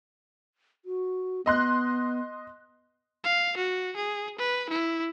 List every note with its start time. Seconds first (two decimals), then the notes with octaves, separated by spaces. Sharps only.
0.85 F#4
1.46 B3 D#5 C6 F#6
3.24 F5
3.57 F#4
3.96 G#4
4.38 B4
4.69 E4